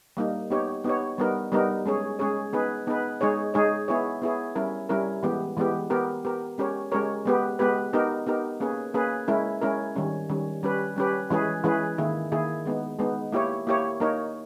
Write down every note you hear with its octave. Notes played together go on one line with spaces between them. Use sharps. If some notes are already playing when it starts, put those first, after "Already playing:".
G3 A#3 D#4
B3 D#4 G4 C#5
B3 D#4 G4 C#5
G3 B3 D#4 A#4
G3 B3 D#4 A#4
G#3 C#4 G#4 C#5
G#3 C#4 G#4 C#5
B3 D#4 G#4 B4
B3 D#4 G#4 B4
G#3 D#4 G#4 C#5
G#3 D#4 G#4 C#5
B3 E4 G#4 C#5
B3 E4 G#4 C#5
G3 C#4 E4 A#4
G3 C#4 E4 A#4
E3 G#3 B3 G4
E3 G#3 B3 G4
B3 G4 A#4
B3 G4 A#4
G#3 C#4 G4 A#4 C#5
G#3 C#4 G4 A#4 C#5
G#3 B3 G4 B4
G#3 B3 G4 B4
B3 D#4 G4 A#4
B3 D#4 G4 A#4
A#3 C#4 G#4 B4
A#3 C#4 G#4 B4
G#3 C#4 E4 A#4
G#3 C#4 E4 A#4
D#3 G3 C#4
D#3 G3 C#4
G3 C#4 G4 B4
G3 C#4 G4 B4
E3 G#3 C#4 G#4 B4
E3 G#3 C#4 G#4 B4
D#3 A#3 E4 G#4
D#3 A#3 E4 G#4
G#3 B3 D#4
G#3 B3 D#4
A#3 E4 G4 C#5
A#3 E4 G4 C#5
A#3 D#4 A#4 C#5